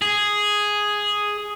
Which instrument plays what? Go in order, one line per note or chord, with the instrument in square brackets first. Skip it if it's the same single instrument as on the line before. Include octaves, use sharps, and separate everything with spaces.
[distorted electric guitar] G#4